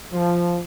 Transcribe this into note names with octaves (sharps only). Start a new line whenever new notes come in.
F3